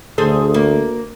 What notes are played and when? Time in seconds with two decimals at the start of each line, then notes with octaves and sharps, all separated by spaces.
0.18 D2 G#4 A4 C5
0.54 A#3